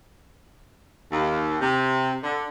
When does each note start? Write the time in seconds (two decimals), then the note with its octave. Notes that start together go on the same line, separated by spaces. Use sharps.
1.11 D#2
1.61 C3
2.23 D3